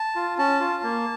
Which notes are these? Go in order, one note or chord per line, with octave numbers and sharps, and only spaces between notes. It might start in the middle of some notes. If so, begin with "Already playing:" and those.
Already playing: A5
F4
C#4 A5
F4
A#3